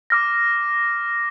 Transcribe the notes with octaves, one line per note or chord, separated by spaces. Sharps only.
D6 F6 A#6